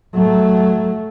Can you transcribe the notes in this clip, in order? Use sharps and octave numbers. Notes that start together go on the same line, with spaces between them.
F#3 A3